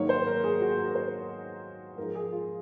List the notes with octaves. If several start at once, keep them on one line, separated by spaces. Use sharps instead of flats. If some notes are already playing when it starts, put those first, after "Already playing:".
Already playing: G#2 D#3 F#3 A#3 C#5
C5
A#4
G#4
F#4
A#4
C5
G#2 F3 G#3 A#4
G#4
F4